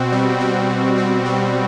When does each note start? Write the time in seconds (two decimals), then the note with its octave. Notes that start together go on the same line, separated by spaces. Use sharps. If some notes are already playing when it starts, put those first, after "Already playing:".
Already playing: B2 C4 F#4
0.12 G3
0.41 F#4
0.70 B2
0.98 C4
1.26 G3